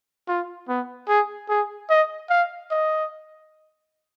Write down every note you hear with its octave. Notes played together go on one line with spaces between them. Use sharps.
F4
B3
G#4
G#4
D#5
F5
D#5